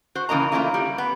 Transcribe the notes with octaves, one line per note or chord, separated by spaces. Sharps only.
F#4 C5
C#3 E3 A#3 D#5 A#5
E3 A3 A#3 C#4 E4 F4
G3
B3